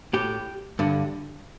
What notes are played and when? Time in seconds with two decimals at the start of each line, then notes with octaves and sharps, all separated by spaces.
0.13 A2 G4
0.79 G2 D3